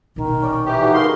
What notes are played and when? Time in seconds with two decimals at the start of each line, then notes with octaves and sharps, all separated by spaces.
0.16 A#1 B2 D#3
0.42 C#4 D5
0.66 E3 G4 D#5
0.81 G3 A3 D#4 F#4
0.94 D2 G#3 A#4 F5 C6